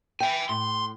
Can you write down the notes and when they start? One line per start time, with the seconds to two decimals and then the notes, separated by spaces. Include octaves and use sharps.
0.20 E5 G5 G#5
0.49 A2 C6